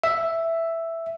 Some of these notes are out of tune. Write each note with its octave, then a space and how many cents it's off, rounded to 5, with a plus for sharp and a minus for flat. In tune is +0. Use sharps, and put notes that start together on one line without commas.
E5 +5